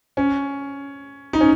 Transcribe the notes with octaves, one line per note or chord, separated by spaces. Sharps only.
C#4
D#4
C#4